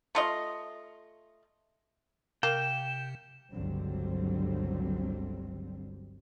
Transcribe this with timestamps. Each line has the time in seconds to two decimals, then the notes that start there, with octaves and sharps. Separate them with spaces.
0.15 A3 F4 D#5
2.43 C3 A#3 G5 E7
3.53 G1 C#2 D3 F#3 G3 C4